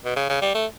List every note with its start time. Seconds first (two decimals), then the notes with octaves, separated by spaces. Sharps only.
0.05 B2
0.16 C#3
0.29 C#3
0.42 G3
0.54 A3